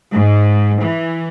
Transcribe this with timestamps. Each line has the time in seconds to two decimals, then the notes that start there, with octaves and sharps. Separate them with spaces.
0.13 G#2
0.83 E3